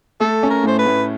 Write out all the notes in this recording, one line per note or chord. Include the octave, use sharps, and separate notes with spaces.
A3 A4
C#4
A#4
A2 C5
B4
A2